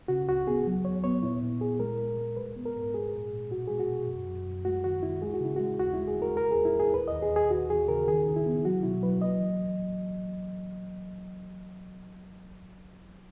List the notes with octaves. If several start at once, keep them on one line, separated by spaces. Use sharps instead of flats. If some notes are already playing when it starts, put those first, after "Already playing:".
C#3 F#4
C#2 F#4
B3 G#4
F#3
D#2 C#5
B3 C#5
A#2 E4
A#2
A#2 G#4
G#3 A#4
G#3
G#3
G#3 B4
B3
A#4
G#2
G#3 G#4
A#2
A#2
B2 F#4
G#3 G#4
F#4
B2
F#2
F#2
F#2
G#3 F#4
D#3 F#4
D#3 E4
G#3 G#4
F#4
C#3 E4
G#3 F#4
D#2 F#4
G#3 E4
G#4
G#3
A#4
E2 A#4
E2 G#4
E4
E2
G#4
D#2 B4
D#2 D#5
G#4
D#2
G#4
D#2 F#4
E3 G#4
C#3 A#4
D#3 G#4
D#3
E4
B3
F#3 F#4
B2 E4
F#3 B4
A#3 D#5
E3